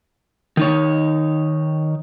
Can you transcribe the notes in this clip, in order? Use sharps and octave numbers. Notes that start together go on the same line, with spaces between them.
D#3 D#4 C#5